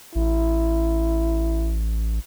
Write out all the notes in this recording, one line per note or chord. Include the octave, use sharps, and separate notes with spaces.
A1 E4